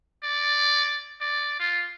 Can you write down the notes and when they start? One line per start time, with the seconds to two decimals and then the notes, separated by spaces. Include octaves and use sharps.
0.23 D5
1.21 D5
1.60 F4